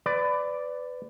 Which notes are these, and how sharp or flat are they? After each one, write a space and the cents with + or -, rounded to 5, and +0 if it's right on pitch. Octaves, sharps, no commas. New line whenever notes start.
B4 +25 D5 +0